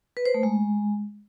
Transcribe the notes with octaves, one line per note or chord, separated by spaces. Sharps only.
B4
C5
A3
G#3